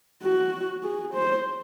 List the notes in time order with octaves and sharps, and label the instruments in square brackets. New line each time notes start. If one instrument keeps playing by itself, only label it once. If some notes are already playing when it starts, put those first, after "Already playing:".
[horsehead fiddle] F#4
G#4
C5